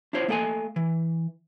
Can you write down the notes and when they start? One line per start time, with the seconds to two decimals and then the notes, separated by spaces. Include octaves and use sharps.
0.13 D4 E4 F4 C5 C#5
0.28 A3 A#3 A4 G5 G#5
0.76 E3